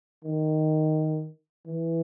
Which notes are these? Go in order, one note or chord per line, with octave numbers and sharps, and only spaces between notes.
D#3
E3